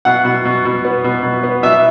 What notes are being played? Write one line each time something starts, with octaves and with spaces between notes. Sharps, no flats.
B2 F#5
B2
B2
B2
B3
B2
B2
B3
B2 E5